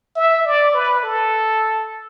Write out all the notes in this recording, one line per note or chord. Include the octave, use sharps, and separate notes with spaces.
E5
D5
B4
A4